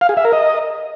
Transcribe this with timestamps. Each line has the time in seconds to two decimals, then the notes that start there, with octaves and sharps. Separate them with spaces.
0.01 F5
0.09 G#4
0.17 E5
0.25 A#4
0.33 D#5